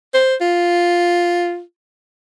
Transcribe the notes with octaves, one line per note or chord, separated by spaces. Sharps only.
C5
F4